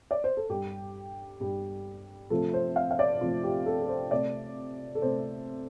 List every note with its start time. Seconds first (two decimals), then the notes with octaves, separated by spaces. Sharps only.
0.11 D5
0.24 C5
0.37 A4
0.49 G2 G3 G4
1.40 G2 G3
2.30 C3 F3 A3 A4
2.54 C5
2.76 F5
2.91 F5
2.99 D5
3.21 C3 F3 A3 F4
3.44 G4
3.66 A4
3.82 A4
3.89 C5
4.11 C3 A3 D5
4.95 A4
5.02 C3 A3 C5